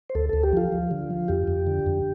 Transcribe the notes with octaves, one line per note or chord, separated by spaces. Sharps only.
C5
D2 A4
D2 A4
G4
F3 F4
F3
D3
F3
F2 G4
F2
D3
F2